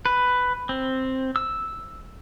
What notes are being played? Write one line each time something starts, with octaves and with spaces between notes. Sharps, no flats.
B4
C4
E6